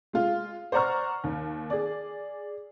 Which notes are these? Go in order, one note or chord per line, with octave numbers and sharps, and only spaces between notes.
G#3 F4
C5 D5 F#5 A#5 C#6 F6
D#2
G#4 D5